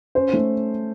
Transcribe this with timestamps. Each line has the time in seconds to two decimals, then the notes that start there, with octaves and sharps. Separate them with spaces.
0.15 C#4 C5
0.33 A3